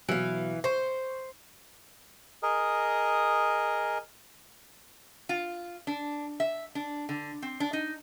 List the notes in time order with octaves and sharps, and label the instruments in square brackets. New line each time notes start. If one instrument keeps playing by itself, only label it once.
[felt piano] B2 F#3 [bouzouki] E3 F5
[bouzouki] C5 [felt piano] C#6
[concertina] G#4 A#4 D#5
[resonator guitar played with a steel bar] F4
D4
E5
D4
D3
C4
D4
D#4